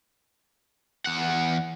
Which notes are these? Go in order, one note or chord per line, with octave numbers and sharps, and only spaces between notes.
E2 F#5